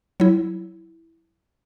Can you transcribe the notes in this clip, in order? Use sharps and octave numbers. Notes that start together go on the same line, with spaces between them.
F#3 E4